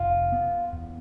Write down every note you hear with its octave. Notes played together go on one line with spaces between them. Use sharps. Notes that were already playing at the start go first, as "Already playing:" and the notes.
Already playing: F1 F4
B3
E2